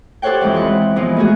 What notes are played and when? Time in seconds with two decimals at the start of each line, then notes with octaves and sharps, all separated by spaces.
0.22 G4 A4 C5 C#5 F#5 G5
0.41 F2 E3 G#3 E4
0.54 C4 B4 F#5
0.96 A#2 E3 F3 G#3 B3 F4
1.17 A3 F#4 G#4